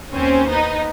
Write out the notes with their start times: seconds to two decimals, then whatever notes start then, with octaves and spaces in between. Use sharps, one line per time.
0.13 D#2 C4 C#4 C5
0.49 B3 D#4